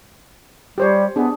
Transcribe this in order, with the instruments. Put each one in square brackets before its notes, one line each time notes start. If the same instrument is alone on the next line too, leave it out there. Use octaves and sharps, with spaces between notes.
[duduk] G3 [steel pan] G4 C5 C#5
[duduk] B3 [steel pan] D4 G#4